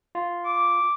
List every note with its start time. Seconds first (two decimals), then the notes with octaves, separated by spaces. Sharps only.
0.15 F4
0.45 D6